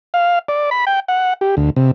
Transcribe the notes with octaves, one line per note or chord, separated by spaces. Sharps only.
F5
D5
B5
G5
F#5
G4
D2
C3